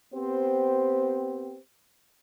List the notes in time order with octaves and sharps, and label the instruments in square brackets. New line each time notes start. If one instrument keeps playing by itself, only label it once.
[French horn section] B3 C4 G4 C5